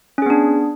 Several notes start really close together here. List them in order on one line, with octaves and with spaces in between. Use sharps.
C#4 G#4 B3 D4